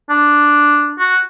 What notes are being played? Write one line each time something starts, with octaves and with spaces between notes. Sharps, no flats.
D4
F#4